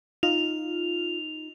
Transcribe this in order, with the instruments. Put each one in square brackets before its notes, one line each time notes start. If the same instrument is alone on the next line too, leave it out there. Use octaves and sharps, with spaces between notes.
[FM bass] D#4 [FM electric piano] F4 [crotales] F7